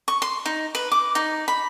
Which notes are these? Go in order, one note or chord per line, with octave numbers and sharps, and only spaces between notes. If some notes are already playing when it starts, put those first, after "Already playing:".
C#6
C6
D#4
B4
D6
D#4
B5